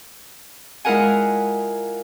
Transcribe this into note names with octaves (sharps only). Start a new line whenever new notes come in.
G#3 E4 F4 A#4 F#5 G#5